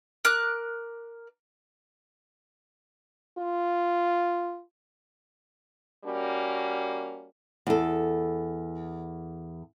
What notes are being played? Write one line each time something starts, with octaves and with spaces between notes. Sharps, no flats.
A#4 D6 F#6
F4
G3 A#3 C#4 F#4
E2 A4